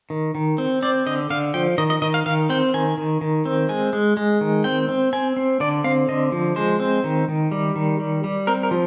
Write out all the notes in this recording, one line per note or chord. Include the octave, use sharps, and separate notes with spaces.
D#3
D#3
C4
C4 D5
D3 D#5
D3 F5
F3 G5
D#3 D#5
D#5
D#3 D#5
F5
D#3 F5
C4 G5
D#3 G#5
D#3
D#3
C4
G#3 G#5
G#3
G#3
D#3
C4 G5
C4
C4 G#5
C4
D3 D5
C4 F5
D3 D#5
F3
G#3 C5
C4
D#3
D#3
G3
D#3
G3
G3
C4 A#4
A#4
F3